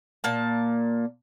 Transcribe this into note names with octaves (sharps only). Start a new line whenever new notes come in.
A#2 A#3 A5